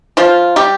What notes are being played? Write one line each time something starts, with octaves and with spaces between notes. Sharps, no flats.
F3 F4
G3 G4